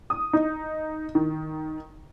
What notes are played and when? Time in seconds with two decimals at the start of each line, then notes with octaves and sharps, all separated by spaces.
0.10 D#6
0.33 D#4
1.15 D#3